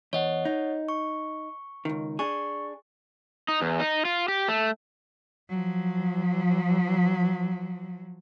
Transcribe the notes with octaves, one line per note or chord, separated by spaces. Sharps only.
E2 C#5 D#5 F#5
D#4
C#6
C#2 D#3
D4 G#4 C#6
D#4
E2
D#4
F4
G4
A3
F3 F#3